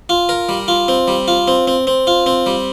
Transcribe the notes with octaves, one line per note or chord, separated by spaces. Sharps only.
F4
A#4
G3
F4
C4
G3
F4
C4
C4
C4
F4
C4
G3